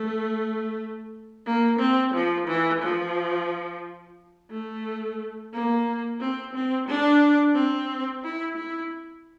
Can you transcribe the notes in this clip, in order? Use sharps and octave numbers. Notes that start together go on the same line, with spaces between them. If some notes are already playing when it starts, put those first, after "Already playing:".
Already playing: A3
A#3
C4
F3
E3
F3
A3
A#3
C4
C4
D4
C4
E4
E4